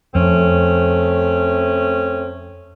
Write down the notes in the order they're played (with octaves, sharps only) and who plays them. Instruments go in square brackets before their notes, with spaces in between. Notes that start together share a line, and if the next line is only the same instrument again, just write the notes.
[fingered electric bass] F2 [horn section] A3 C4 C#4